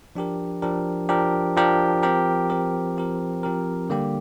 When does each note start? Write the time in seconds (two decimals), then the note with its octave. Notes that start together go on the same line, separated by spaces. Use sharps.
0.15 F3 D4 G4 A#4
0.62 F3 D4 G4 A#4
1.09 F3 D4 G4 A#4
1.56 F3 D4 G4 A#4
2.03 F3 C4 G4 A#4
2.50 F3 C4 G4 A#4
2.97 F3 C4 G4 A#4
3.43 F3 C4 G4 A#4
3.90 D3 G3 A#3 G4